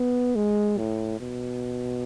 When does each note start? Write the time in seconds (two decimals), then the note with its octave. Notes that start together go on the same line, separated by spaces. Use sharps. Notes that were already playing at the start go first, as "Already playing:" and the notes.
Already playing: B3
0.35 G#3
0.78 A2
1.20 B2